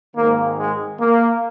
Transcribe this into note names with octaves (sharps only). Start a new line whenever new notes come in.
G#1 G#2 D#3 A#3
G#3
A#3